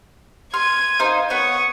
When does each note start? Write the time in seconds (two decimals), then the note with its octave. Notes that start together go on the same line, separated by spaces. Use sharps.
0.54 C6 F6 G#6 D#7
0.99 D#4 C5 F5
1.30 B3 C#5 C#6 D#6